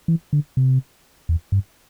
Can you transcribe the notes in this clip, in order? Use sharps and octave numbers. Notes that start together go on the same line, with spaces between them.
E3
D3
C3
E2
G2